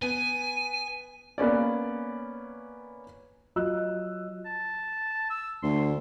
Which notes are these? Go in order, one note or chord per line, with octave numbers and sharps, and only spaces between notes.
B3 G#5 D#7
A#3 B3 C#4 D5
F#3 F4 D#5 E6 F#6
A5
E6
D2 C6